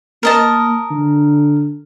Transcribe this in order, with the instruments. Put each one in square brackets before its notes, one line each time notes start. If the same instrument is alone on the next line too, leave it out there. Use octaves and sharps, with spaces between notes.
[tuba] A#3 [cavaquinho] A#4 D#5 A5
[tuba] D3